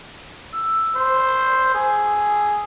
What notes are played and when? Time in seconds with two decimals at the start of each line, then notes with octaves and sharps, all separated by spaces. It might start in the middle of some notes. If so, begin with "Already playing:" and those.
0.53 E6
0.95 C5
1.74 G#4